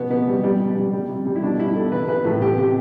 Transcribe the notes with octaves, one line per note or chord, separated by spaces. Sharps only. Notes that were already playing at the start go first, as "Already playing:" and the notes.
Already playing: B2 B3
B2 B3
G3
G3
B2
G3
G3
C3
G3
E4
B2 D4
G3 E4
B2 A4
E3 B4
E3 B4
A2 A4
C3 G4
C3 G4